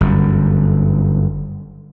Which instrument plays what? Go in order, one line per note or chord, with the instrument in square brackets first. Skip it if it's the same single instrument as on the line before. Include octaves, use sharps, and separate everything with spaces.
[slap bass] G1 F#2